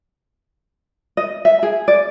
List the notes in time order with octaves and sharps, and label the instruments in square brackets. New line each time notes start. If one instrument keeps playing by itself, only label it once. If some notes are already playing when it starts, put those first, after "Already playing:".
[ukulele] D#5
E5
G#4
D5